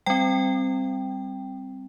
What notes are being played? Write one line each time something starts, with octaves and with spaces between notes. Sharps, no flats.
G3 C4 G5